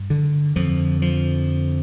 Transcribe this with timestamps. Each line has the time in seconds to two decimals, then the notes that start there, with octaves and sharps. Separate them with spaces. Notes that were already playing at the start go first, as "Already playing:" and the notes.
Already playing: G2
0.10 D3
0.56 F2 D3 F3
1.02 F3